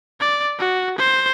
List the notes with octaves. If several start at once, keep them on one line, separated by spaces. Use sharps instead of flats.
D5
F#4
C5